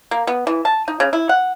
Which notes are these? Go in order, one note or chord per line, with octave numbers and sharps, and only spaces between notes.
A#3
B3
E3
A5
D#4
C#3
E4
F#5